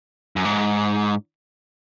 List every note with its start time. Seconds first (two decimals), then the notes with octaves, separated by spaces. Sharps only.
0.36 F#2
0.45 G#2